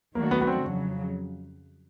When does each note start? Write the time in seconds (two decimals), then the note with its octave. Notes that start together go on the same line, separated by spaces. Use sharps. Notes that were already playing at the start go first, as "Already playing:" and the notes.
0.15 D#3 F#3 A3 A#3 D4 F#4
0.31 B3
0.41 B3
0.47 C4
0.64 F2 C#3 F#3